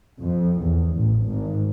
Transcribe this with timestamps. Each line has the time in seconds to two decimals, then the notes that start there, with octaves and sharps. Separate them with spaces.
0.22 F2
0.63 E2
0.97 A1
1.27 G#1